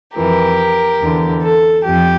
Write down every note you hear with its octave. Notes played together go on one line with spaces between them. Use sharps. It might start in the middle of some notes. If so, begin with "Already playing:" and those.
F2 E3 G4 A#4
E2 D3
A4
F2 G4